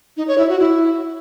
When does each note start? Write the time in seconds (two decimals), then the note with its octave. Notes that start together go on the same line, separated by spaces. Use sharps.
0.17 D#4
0.28 C#5
0.38 E4
0.49 F#4
0.59 E4